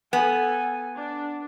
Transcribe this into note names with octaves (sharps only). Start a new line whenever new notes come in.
B3 A4 G#5
D4